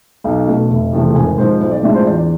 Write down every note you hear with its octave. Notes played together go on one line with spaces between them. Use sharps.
B1 F5
B2 A3
F1
E2 C3 F3 A3
G#1 G#5
G#2 F3 C5
B1 C5
D5
A2 G#3 D4 F4 E5
C5
E2 D5